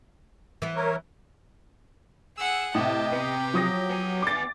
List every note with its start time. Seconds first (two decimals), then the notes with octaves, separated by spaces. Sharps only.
0.62 E3 B3
0.76 A#4 C#5
2.37 G#4 F#5 E6
2.75 A2 C3 G4 D#5 A5
3.12 C3 B3
3.54 F3 F#3 D#6 A#6
3.90 B3 G#5
4.22 D6 A6